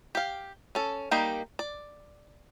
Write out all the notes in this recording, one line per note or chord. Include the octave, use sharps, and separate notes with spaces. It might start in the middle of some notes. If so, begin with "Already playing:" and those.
G4 F5
C#4 A4
G3 A#3 D#4 G4
D5